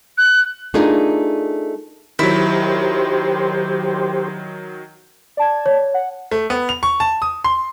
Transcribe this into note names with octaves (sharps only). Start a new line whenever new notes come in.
F#6
A3 D4 D#4 F4 G#4 A#4
D#3 F#3 E4 G4 C5
D5 A5 G#6
C#5
F#5
A3
B3
F7
C#6
A5
D#6
C6